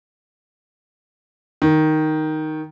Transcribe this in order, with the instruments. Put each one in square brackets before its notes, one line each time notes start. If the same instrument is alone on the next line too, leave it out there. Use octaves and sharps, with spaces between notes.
[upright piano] D#3